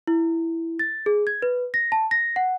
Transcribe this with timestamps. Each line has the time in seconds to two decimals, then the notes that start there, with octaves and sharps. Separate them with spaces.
0.07 E4
0.79 A6
1.06 G#4
1.27 G#6
1.42 B4
1.74 A#6
1.92 A5
2.11 A#6
2.36 F#5